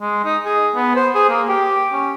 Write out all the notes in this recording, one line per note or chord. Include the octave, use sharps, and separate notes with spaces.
G#3
D#4
G#4
B3
C5
G#4
A#3
G4
C#4